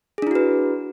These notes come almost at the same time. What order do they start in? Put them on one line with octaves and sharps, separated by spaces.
G#4 D4 E4 F#4 B4